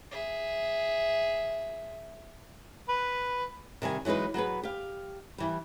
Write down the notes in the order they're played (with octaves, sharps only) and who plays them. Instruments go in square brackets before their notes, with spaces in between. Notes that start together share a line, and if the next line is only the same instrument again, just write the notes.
[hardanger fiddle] G#4 E5
[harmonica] B4
[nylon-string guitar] C3 D#3 G3 G#5
E3 F#3 G#3 D#4 B4
F#3 B3 G#4 B4
G4 F5
E3 G3